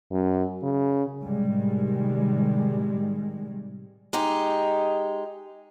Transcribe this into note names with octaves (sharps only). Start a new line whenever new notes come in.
F#2
C#3
A2 C3 D#3 G3 G#3
G#3 D#4 G4